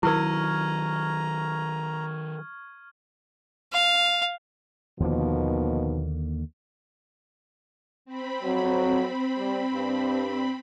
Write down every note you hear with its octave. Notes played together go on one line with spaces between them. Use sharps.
D#3 F#3 E4 A#4 A#5 C#6 F6 G#6
F5
D#2 B2 D3 D#3 F3 A#3
C4 B5
F2 F#3
G3
G2